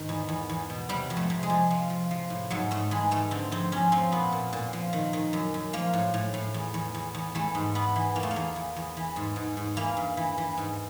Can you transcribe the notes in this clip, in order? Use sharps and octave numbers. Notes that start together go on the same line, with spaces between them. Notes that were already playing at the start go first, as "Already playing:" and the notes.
Already playing: G#2 D#3
E2
E2
E2
B2
C3 G3
F2
A3
C3
G#3
F2
F3
F3
F3
A2
G#2 F#3
G#2 A3
E3 G#3
G#2 A3
D3 C4
F2 C4
F2 C#4
F3 C4
A#2 B3
A#2
A#2
F3
D#3
D#3
F#2
F#2
F3 A#3
A2
A2
A2
E2
E2
E2
E2
E3 A3
G#2
G#2 B3
E3
E2 A#3
A3
A#3
E2
E2
E2
E3
G#2
G#2
G#2
E3 A#3
G2
E3
E3
G#2